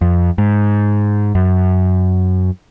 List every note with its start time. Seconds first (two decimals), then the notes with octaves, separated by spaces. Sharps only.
0.01 F2
0.38 G#2
1.35 F#2